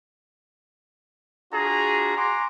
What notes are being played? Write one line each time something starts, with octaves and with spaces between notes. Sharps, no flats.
D4 F4 F#4 G#4 A#5
F#4 G#5 A#5 C6 D6